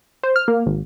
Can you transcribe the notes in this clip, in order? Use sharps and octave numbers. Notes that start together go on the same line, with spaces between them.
C5
F6
A#3
G#1